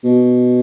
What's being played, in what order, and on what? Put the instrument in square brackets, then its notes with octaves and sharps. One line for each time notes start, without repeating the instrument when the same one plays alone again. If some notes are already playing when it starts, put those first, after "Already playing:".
[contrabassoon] B2